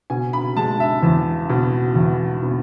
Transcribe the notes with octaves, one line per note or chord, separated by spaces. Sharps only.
B2 G#5
B5
G#3 A5
E5
E2
B2
E2
B2